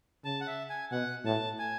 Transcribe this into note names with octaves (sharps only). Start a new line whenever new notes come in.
C#3 A5
F#5
E5
G#5
B2 F#5
A2 A5
G#5